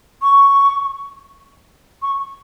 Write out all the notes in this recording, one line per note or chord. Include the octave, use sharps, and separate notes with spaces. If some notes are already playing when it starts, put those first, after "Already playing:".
C#6
C#6